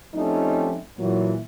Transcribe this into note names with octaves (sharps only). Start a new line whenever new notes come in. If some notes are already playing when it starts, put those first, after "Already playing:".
F3 G3 A3 C4 C#4 D#4
A#2 E3 F#3